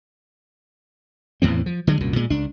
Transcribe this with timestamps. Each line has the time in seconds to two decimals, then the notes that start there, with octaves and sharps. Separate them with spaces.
1.42 E2 A2 E3 C4
1.66 F3
1.87 D3 F#3 G#3
2.01 C2 F#2 A#2
2.16 A#2 G#3
2.30 C#2 D4